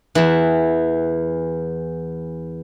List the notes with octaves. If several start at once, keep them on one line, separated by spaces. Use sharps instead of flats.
E2 E3